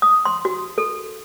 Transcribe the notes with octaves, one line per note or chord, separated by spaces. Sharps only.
D#6
C6
F#4
A4